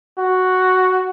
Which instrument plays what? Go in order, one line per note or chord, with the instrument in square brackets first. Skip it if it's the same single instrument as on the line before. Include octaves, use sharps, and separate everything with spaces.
[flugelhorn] F#4